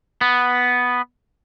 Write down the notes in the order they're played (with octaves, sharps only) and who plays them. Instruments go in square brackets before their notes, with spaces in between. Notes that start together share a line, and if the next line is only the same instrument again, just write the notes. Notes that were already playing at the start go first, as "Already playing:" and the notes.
[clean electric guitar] B3